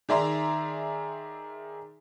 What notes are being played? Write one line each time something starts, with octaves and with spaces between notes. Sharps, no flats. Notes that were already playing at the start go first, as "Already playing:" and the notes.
D#3 G#4 D5 E5 A#5 C6